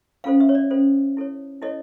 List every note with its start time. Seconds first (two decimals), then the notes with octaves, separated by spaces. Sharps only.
0.24 C#4 F4 A4 C5 F5
0.40 E5
0.49 C#5
0.55 D5
0.71 C#4 F4 A4 C5
1.17 E4 A4 C#5
1.62 E4 A4 C#5 D#5